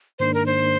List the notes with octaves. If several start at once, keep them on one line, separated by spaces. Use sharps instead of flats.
G#2 D#3 A#3 D4 C5
A#4
C5